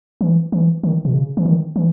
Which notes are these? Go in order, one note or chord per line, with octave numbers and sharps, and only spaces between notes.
E3
E3
D#3
B2
C#3
E3
D#3
E3